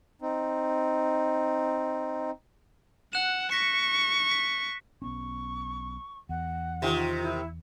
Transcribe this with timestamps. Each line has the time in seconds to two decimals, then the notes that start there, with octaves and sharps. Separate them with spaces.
0.22 C4 D#4
3.13 F#5 F#6 E7
3.51 C#6 A#6 B6 C#7
4.31 B6
5.02 B1 B3 C#4 C#6
6.29 E2 F#5
6.82 C3 D#3 F4
7.22 E4